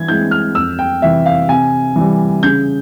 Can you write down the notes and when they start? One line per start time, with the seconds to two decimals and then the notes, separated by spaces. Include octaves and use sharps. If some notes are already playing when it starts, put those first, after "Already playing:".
Already playing: E3 G#6
0.08 G#3 C4 E4 G6
0.31 F6
0.55 F2 E6
0.79 G5
1.02 C3 E3 E5
1.26 F5
1.49 C3 G#5
1.96 E3 G3
2.43 C#3 G6